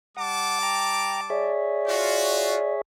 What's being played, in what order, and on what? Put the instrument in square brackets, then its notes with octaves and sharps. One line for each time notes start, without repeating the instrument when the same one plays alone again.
[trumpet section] G3 A5 D6 [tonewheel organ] F#5
[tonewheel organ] G5 A#5
[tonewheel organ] G#4 C#5 E5 [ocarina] D5
[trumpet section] F4 F#4